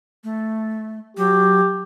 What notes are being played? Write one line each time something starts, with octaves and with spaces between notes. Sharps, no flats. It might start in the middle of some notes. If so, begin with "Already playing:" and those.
A3
F#3 G4